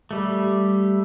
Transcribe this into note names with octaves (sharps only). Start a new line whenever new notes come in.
G3 A3